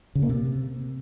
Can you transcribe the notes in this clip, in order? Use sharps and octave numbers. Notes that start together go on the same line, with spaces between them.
C#3
A#3
C3